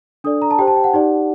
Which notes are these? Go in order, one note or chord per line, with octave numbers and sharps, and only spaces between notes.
D4 A4 D5 D#6
A#5
A5
G4 C5 G5
A5
G5
F#5
D#4 G4 D5